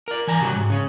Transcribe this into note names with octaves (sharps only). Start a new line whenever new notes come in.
A#4 D5
E3 G#5 A#5
C3 F#3 G3 A3 F#4
G#2
C#3 C#4